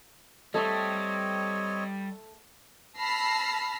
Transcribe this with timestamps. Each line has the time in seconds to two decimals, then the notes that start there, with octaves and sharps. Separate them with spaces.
0.54 G3 A3 C4 C#5 D#5 D#6
2.98 A5 B5 E6 F6 A#6 C7